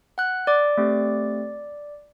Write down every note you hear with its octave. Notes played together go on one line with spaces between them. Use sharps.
F#5 F#6
D5 D6
A3 C4 G4